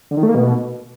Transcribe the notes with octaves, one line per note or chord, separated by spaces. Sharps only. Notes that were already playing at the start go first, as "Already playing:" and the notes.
D3
D#3
A3
A#3
B2